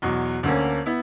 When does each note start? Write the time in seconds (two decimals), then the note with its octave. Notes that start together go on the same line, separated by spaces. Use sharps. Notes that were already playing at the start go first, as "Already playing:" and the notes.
0.02 E2 B2 F#3
0.43 D2 D3 A#3 C#4
0.86 B3 E4